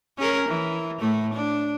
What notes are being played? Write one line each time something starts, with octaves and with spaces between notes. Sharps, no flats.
C#4 G#4 A#4
E3
A2 A3
D4